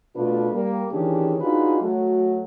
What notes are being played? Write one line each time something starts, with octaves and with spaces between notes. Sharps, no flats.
B2 A3 D4 F4 B4
G3 A#3
D#3 E3 C#4 D4 G4 G#4
D4 D#4 F4 F#4 G#4 B4
F#3 A3 F#4